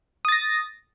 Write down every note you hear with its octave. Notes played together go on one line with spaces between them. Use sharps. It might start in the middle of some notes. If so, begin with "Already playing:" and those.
D#6 A6 A#6